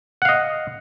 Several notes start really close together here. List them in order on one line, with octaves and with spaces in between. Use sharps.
F#5 F5 D#5